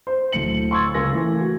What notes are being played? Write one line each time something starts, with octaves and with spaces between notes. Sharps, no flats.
C5
D1 A3 C#7 F#7
C6 C#6 E6 G#6 A6
C#2 A#4 G#5 E6 A#6
E3 A3
F#4